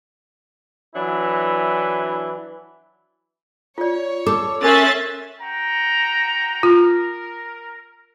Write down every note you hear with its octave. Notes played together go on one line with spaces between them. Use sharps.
E3 F#3 D4 E4
F4 C#5 D5
A4 D6
C#4 A#4 E5 G#5 C6 F#6 A6
F#4 G5 A#5
F4 A#4